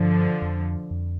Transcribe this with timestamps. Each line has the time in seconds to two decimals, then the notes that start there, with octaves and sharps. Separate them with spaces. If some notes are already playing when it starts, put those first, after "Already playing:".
Already playing: G2 D3 F3
0.42 F2
0.91 F2